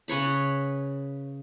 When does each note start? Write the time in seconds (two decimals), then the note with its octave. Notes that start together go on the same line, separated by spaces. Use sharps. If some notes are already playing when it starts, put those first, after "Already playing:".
0.08 C#3 B4 C#5 B5